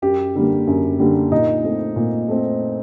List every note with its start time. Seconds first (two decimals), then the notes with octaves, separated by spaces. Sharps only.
0.02 F#2 G4
0.35 D3 G3 A#3
0.67 F#2
1.00 D3 G3 A#3
1.32 A#2 D#4
1.64 A3 C4
1.96 A#2
2.29 A3 C4